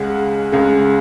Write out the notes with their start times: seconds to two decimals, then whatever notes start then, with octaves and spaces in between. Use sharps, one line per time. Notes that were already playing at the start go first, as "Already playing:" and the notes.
Already playing: C#2 C#3 G#3 F#5
0.52 C#2 C#3 G#3